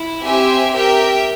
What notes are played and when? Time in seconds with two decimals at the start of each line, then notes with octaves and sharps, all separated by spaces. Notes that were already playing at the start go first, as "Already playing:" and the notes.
Already playing: E4
0.25 C4 G4 C5 E5 G#5
0.74 G4 A#4 E5 G5